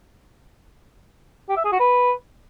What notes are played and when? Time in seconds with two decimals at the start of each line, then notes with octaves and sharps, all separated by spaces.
1.49 G4
1.57 E5
1.64 G#4
1.72 F#4
1.80 B4